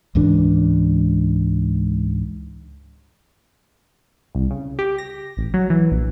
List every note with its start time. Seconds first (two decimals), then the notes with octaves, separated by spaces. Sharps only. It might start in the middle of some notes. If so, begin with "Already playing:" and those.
0.15 C#2 G#2 E3 D4
4.35 C2
4.51 C#3
4.79 G4
4.98 A#6
5.37 A1
5.54 F#3
5.70 E3
5.91 A#1